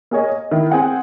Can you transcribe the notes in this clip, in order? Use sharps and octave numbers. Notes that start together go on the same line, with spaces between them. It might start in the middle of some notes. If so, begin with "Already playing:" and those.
A#3 G#4 C#5 D#5
D#5
D#3 E4
C4 G#4 F#5 G5